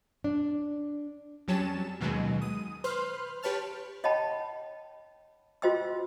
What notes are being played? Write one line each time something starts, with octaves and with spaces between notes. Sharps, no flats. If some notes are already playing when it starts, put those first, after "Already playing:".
D4
F2 F#3 G3 C#4 A5 E7
D#2 B2 D#3 F#3 G#3
D#6
B4 C5 C6 F6
G4 B4 C#5 A5 F6
C#5 D#5 F#5 G5 A5 B5
F4 F#4 C5 D#5 G5 E6